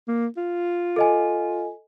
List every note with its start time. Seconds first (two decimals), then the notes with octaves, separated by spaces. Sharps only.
0.08 A#3
0.37 F4
0.96 A4 D#5 G#5